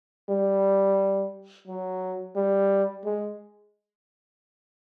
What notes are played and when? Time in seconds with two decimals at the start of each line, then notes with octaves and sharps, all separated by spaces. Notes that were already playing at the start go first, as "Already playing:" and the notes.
0.29 G3
1.68 F#3
2.36 G3
3.05 G#3